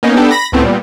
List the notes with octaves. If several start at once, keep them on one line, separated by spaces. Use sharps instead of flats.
A#3 B3 C#4 D#4
B3 D4 G4 A4
B5 A#6
C#2 A2 A3 B3 C4
A#2 G3 B3